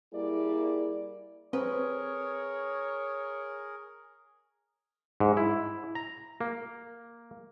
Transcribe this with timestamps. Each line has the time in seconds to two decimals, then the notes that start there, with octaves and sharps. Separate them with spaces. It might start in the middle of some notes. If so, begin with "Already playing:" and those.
0.13 G3 A#3 E4 G#4 D5
1.53 C4 G#4 A#4 B4 C#5
5.20 G#2
5.37 E4
5.95 A#5
6.41 A#3